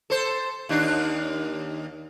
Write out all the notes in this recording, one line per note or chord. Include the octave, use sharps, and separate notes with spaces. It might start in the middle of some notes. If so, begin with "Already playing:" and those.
A4 C5
D#2 D4 D#4